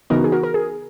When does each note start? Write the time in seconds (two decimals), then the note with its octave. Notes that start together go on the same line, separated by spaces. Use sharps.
0.10 C#3 E3 B3 D#4 F#4 A#4
0.24 G#4
0.32 F#4 A#4
0.43 A#4
0.54 G#4